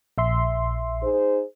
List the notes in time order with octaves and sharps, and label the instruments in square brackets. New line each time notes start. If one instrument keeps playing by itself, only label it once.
[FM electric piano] A#1 E5 C6
[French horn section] D#4 G#4 C5